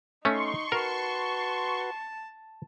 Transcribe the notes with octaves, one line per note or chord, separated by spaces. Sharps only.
A3 C#4 D#4 C6 C#6
F#4 A#4 B4 A5